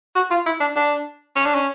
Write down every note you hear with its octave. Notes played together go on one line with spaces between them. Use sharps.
F#4
F4
E4
D4
D4
C#4
D4
C#4